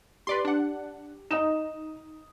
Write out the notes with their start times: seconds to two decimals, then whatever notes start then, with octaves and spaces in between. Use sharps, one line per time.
0.27 G4 B4 D5 C6
0.45 D4 F#5
1.31 D#4 D#5 D#6 E7